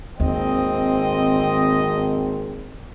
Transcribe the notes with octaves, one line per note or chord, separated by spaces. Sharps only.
G#1 D#2 C4 D#5